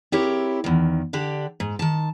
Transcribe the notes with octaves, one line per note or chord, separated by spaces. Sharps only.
C4 E4 G4 A#4 C#5
E2 D#3
D3 D4 G4
G#2
D#3 A5